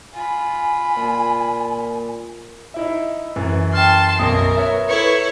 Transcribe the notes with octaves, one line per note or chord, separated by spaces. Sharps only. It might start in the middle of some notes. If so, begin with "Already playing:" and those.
F4 G#5 B5
A#2
D#4 E4 E5
F#2 E3
G5 A5 C6 F6
B1 F#2 A#4 D#6
B4 C#5 E5
E4 A4 B4 C#5 C#7